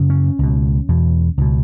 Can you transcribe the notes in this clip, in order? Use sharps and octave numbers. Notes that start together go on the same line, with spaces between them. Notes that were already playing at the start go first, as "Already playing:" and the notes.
Already playing: F#2 C#3
C#4
C#2 B2
E2 B2
C#2 B2